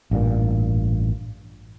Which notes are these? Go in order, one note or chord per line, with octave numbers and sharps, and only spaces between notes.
A1 G2 A#2